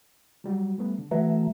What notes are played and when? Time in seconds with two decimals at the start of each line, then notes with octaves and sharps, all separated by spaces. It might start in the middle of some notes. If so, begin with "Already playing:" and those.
0.44 F#3 G3 F#4
0.78 G3 A3 B3
0.98 D3
1.11 E3 A3 F#4 A#5